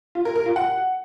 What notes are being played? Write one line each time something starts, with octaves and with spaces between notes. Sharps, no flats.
F4
A#4
A#4
F4
F#5